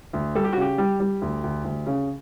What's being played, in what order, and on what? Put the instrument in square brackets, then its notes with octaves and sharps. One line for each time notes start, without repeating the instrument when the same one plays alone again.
[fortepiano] D2
G3 A4
G4
F#4
C#3 G4
G3
G3
D2
D2
D2
C#3